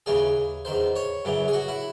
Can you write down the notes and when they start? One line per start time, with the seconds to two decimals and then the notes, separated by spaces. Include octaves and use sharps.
0.06 D#2 C#3 E3 G#4
0.65 E2 D#3 C5
0.96 C#5
1.25 F#2 C#3 E3
1.48 G#4
1.53 F#4
1.68 E4